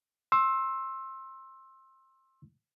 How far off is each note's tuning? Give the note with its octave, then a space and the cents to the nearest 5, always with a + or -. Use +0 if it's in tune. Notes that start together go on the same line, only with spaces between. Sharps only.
C6 +25 E6 +0